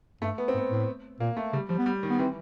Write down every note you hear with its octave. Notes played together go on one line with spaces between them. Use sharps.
G2 A3
B3
C4
G#2
B3
A2
A#2 A#3
A3
C#3 G3
F3 G3
B3
G3
D#3
B3
E3 C4